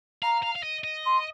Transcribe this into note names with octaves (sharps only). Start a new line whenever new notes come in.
F5 A#5
F5
F5
D#5
D#5
C6